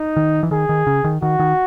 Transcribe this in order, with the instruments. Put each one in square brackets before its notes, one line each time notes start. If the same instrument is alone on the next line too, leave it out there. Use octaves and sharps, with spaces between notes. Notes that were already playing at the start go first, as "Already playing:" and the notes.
Already playing: [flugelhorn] D#4
[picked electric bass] D#3
E3
[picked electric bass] D#3 [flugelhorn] G#4
[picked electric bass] D#3
C#3
D#3
[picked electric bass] D#3 [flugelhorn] F#4
[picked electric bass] D#3